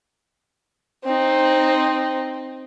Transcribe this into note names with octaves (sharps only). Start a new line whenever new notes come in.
C4 D#4